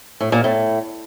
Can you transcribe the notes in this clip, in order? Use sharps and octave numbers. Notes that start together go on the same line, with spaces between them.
A2
A#2
A2